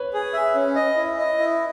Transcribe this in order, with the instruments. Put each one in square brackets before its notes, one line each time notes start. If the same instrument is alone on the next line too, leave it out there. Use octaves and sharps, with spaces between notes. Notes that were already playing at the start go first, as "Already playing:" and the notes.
Already playing: [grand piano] B4 C#5
[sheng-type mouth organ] G#4
E5
C#4
D#5
E4
D#5
E4